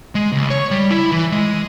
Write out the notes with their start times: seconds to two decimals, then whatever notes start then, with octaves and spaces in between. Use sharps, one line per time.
0.15 G#3
0.32 C#2
0.50 C#5
0.71 G3
0.91 E4
1.12 E3
1.32 G#3